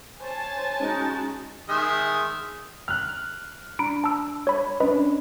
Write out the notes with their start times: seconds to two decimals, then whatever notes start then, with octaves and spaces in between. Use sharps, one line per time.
0.21 C5 C#5 G#5 A5 A6
0.80 G#3 C#4 D#4 F#4
1.69 D#3 G#3 E5
2.88 F6 F#6
3.79 D4 A#5 B5 D7
4.04 A5 E6
4.47 C#5 B5
4.80 C#4 D4 B4 D#5 B5